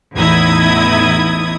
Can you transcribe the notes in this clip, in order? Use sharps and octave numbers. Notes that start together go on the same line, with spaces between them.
A1 E2 D#4 E4 D#6 G#6